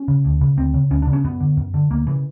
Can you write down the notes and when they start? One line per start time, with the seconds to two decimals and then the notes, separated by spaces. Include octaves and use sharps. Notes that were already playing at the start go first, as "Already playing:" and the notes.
Already playing: C#4
0.08 C#3
0.25 D2
0.41 C#3
0.57 D2 C4
0.74 C#3
0.91 D2 C#4
1.02 D4
1.07 C#3
1.13 C#4
1.24 F#2 B3
1.40 D3
1.57 F#2
1.74 D3
1.90 D2 A#3
2.07 C#3 E3